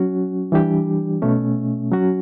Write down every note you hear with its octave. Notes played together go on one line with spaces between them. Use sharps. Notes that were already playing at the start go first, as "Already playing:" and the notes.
Already playing: F#3 C#4 F#4
E3 G3 D4 G4
B2 A3 C#4
F#3 C#4 F#4